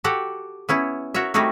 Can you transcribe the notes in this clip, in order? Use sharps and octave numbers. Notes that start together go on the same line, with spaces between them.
F#4 G4 A4 F#5
B3 C#4 E4
F#4 A#4 C#5 E5
G3 A3 C4 D#4 E4 F#4